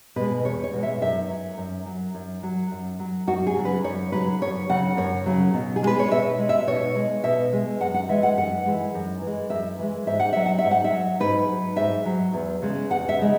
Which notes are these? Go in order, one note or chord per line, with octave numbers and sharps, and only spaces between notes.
B2 G#3 B4
E2 C#5
C#5
B2 G#3
E5
F#2 E5
F#3
F#2
F#3
F#2
F#3
F#2
F#3
F#2 F#4
G#4
C#3 F#3
B4
F#2 C#5
C#3 F#3 B4
F#2 C#5
C#3 F#3 F#5
F#2 C#5
C#3 F#3
B2
G#4
G#3 B4
C#5
B2 E5
G#3
E5
B2 C#5
G#3
B2 E5
G#3
F#2 F#5
F#5
E3 G#3 E5
F#5
F#2 F#5
E3 G#3
F#2
E3 G#3
F#2 E5
E3 G#3
G#2 E5
F#5
F#3 E5
F#5
E5
G#2
F#5
E5
F#3
G#2 B4
F#3
G#2 E5
F#3
E2
C#3 G#3
E2 F#5
E5
C#3 G#3